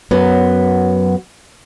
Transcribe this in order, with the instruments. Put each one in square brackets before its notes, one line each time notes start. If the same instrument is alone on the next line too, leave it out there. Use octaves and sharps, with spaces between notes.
[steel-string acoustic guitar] F#2 F#3 B3